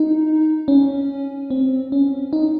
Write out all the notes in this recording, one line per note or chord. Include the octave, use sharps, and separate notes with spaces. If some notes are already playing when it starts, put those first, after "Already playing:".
Already playing: D#4
C#4
C4
C#4
D#4